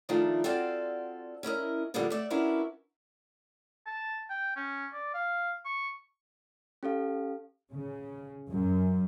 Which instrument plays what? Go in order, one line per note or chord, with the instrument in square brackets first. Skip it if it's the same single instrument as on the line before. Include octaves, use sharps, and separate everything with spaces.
[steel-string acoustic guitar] D#3 F3 A3 D4 D#4 F4
C4 F4 F#4 A4 D5 F5
C#4 E4 A#4 D#5
D3 F3 G3 G#3 A#3 B3
A3 D5 E5
C#4 D4 E4 F#4 A#4 B4
[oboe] A5
G5
C#4
D5
F5
C#6
[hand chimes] C#4 G4 A4 F5
[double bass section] C#3
F#2